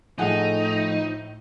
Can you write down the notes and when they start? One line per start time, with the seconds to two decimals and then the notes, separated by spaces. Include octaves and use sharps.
0.18 A2 F3 D#4 G#4 A4 F#5